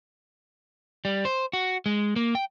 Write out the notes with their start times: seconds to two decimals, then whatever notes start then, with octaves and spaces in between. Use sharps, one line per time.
1.05 G3
1.25 C5
1.53 F#4
1.86 G#3
2.16 A#3
2.35 G5